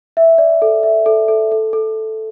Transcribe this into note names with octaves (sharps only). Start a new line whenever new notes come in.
E5
D5
A4
E5
A4
A4
A4
A4